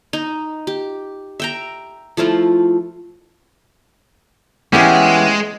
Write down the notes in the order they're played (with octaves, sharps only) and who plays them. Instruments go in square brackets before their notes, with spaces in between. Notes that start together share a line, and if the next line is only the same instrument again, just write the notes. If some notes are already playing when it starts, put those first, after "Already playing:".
[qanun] D#4
G4
E5 G5 A#5
F3 A3 E4 F4
[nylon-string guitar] E3 B3 [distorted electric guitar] G#3 [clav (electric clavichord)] C#4 G4